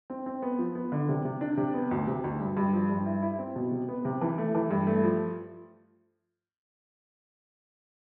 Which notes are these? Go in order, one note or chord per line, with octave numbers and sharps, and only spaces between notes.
C4
C4
B3
F3
B3
D3
C3
C3
D4
C3
B3
D2
C3
D2
G2
G2
F3
G2
E4
E4
C4
B2
C3
B3
C3
E3
A3
E3
G2
A3
F3